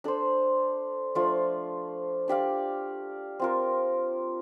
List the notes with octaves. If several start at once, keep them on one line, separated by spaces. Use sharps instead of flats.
D4 A4 C5
F3 A3 D4 F4
D4 G4 D5 F5
C4 F4 A#4